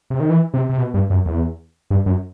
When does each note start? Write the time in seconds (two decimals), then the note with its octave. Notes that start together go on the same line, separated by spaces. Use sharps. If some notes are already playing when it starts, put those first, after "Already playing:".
0.10 C3
0.20 D#3
0.30 E3
0.54 C3
0.69 C3
0.78 B2
0.94 G2
1.10 F#2
1.26 E2
1.90 G2
2.06 F#2